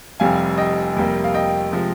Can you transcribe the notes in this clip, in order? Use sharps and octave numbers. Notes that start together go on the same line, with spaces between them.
F1 F2 C3 G3 F5 G#5
D#5 G5
F2 C3 G3 A#3
F5
D#5 G5
C3 F3 G#3